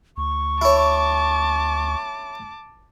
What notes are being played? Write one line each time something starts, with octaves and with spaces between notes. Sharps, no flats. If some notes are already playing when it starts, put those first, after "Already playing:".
D2 C#6
E4 C#5 A5 D6